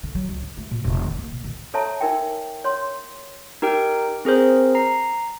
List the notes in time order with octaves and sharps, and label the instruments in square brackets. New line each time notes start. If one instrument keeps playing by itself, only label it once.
[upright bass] D3
F#3
C#2
D#4
A3
A#2
E1
D#3
A#3
B2
D#3
[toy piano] A4 C#5 E5 A5 A#5
D#4 A#4 E5 G5
C#5 C6
[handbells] D#4 G4 A#4 G5
C4 G#4 A#4 C5
A#5 C7